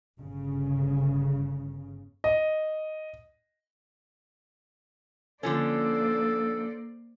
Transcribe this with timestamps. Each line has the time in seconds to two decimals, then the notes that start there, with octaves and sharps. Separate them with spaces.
0.18 G1 C#3
2.24 D#5
5.43 D3 F3 A#3 C#4 A4 C5 D5